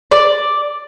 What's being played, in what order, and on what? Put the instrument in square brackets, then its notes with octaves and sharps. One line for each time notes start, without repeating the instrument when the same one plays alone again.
[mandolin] D5